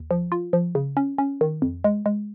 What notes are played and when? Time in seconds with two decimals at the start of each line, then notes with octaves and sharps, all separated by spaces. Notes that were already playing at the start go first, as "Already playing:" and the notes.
Already playing: D#2
0.11 F3
0.32 F4
0.53 F3
0.75 C#3
0.97 C#4
1.18 C#4
1.41 D#3
1.62 F2
1.84 G#3
2.06 G#3